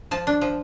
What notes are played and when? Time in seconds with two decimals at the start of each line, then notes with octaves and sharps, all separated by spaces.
0.11 F3 A5
0.27 D4
0.41 F3